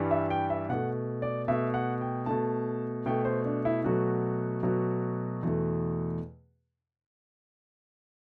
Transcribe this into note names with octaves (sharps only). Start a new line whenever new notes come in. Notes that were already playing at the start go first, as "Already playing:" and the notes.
Already playing: G2 E3 G3
E5
G5
E5
B2 A3 F#5
D5
B2 A3 E5
F#5
G5
B2 A3 A5
B2 A3 G5
C5
D4
E4
B2 F#3 A3 F#4
B2 F#3 A3
E2 B2 A3